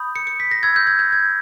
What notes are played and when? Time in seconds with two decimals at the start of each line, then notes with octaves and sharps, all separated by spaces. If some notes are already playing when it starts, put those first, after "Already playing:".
Already playing: B5 D#6 G6
0.16 C#7
0.27 C#7
0.40 B6
0.51 A#6
0.63 B5 E6 G6 G#6
0.76 G6
0.87 G#6
0.99 G6
1.12 G#6